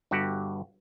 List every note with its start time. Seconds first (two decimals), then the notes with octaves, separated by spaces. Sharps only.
0.11 G1 G2 F#4 G4 F#5